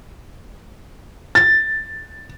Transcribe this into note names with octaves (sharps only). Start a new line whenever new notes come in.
A6